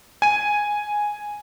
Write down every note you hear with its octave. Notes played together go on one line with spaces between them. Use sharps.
G#5 D#7